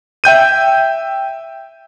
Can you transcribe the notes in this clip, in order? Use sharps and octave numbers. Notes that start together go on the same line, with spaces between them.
E5 G5 G6 D#7